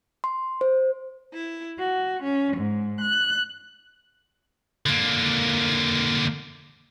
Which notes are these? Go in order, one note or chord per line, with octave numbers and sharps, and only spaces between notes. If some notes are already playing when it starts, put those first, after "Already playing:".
C6
C5
E4
F#4
C#4
G#2
F#6
D3 A#3